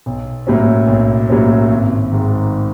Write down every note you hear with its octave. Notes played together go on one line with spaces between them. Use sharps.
B1
A2 F#3 A#3 C#4
B1
A2 F#3 A#3 C#4
G#1
G#2 D#3